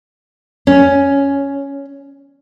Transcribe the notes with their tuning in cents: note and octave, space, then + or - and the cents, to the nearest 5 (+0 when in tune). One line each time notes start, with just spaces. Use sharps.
C#4 +5